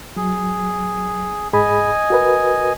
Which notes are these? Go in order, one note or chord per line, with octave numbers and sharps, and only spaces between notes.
F#3 G#4
G#2 G#4 D#5 G#5 B5
F#4 A#4 B4